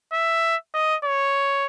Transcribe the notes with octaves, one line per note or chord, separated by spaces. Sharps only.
E5
D#5
C#5